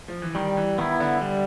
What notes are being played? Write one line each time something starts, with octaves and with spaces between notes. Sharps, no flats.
F3
E3
D#3 G3
E3
D#3 B3 E4
D3
G3